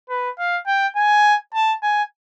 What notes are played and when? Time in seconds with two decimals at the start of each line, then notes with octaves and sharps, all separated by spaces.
0.10 B4
0.39 F5
0.67 G5
0.96 G#5
1.54 A5
1.83 G#5